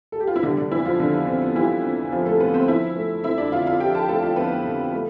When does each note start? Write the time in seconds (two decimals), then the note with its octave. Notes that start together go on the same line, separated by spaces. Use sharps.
0.12 A4
0.20 G4
0.27 F4
0.36 E4
0.43 D3 G3 D4
0.57 D3 D4
0.71 F2 E3 E4
0.85 F3 F4
0.99 F2 D3 D4
1.14 B3
1.27 D3 C4
1.42 B3
1.56 E3 G3 E4
1.84 F2
2.12 F2 F3 F4
2.26 A3 A4
2.40 D3 B3 B4
2.54 C4 C5
2.68 F3 E4 E5
2.96 A3
3.24 F2 E4 E5
3.38 D4 D5
3.52 D3 F4 F5
3.67 F4 F5
3.80 F3 G4 G5
3.95 A4 A5
4.09 A3 A4 A5
4.22 F4 F5
4.36 F2 B3 B4
4.64 D3
4.92 A3